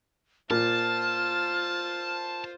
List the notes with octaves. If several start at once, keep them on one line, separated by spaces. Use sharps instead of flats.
A#2 F4 C5 A5 F6